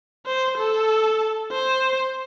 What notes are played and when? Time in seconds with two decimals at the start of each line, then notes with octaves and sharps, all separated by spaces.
0.26 C5
0.57 A4
1.52 C5